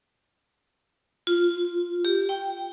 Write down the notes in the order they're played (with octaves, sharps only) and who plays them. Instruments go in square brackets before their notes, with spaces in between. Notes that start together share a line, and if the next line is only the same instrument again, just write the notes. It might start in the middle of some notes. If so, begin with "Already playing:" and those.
[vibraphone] F4
G4
G5